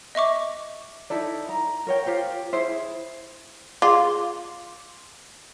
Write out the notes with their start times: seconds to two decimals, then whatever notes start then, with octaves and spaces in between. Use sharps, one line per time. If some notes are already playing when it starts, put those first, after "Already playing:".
0.15 D#5 E5 C#6 D6
1.10 D#4 E4 A4 D5
1.49 A#5
1.87 A#4 C#5 G5
2.06 F4 G4 C5 G5
2.52 E4 G#4 C5 E5
3.82 F4 G#4 F5 D6